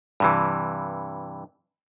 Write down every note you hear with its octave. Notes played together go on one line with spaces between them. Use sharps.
G2 C3 E3